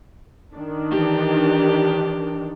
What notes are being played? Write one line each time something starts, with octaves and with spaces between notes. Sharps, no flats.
D#3 D4
E3 G4